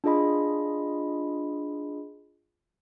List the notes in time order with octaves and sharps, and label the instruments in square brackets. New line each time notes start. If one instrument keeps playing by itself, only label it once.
[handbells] D4 F4 G#4 D#5 B5